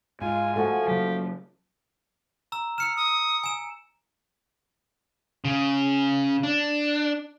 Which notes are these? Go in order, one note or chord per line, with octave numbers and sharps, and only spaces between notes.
G#2 F4 G#5
F3 A3 F#4
C#3 F#3 G4
A#5 E6
E6 F6 C#7 E7
D#6
G#5 E7
C#3
D4